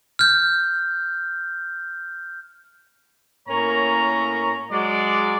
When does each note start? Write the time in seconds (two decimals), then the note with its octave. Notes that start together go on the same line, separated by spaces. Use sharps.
0.19 F6 G6
3.49 A2 A#3 C#4 A#4 C#5 A#5
4.72 F#3 G#3 D5